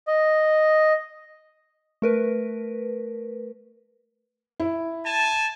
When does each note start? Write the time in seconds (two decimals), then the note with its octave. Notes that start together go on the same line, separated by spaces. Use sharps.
0.07 D#5
2.02 A3 A#4 B4
4.60 E4
5.05 G#5 A5